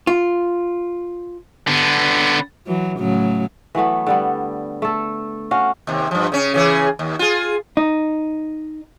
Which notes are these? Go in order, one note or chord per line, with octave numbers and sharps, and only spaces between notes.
F4
D3 B3
E3 F#3
A2 C#3 F#3
E3 F#3 A3 B3
D3 G3 B3
A3 A4
C#4 F#4 F5
D#2 C3
G2 F3
C#3 C#4
C#3 E3 G#4
D#2
F4 G#4
D#4